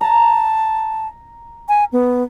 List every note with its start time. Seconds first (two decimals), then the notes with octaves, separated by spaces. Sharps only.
0.01 A5 A#5
1.69 G#5
1.92 B3